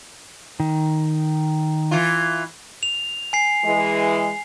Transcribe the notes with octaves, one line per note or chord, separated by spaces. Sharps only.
D#3
E3 F4
F7
G#5 C7
E3 G#3